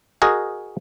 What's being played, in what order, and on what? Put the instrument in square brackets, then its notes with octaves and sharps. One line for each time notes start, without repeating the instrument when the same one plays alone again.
[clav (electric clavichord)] F#4 G#4 A#4 D#5